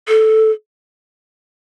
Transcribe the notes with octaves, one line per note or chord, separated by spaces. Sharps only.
A4